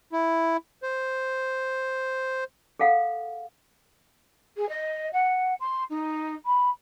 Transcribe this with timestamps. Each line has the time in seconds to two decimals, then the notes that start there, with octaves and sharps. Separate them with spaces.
0.13 E4
0.83 C5
2.80 G#4 A4 F5 F#5
4.56 G#4
4.69 D#5
5.13 F#5
5.60 C6
5.90 D#4
6.46 B5